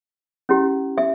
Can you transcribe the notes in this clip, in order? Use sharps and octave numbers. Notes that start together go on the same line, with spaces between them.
C#4 E4 G4
E5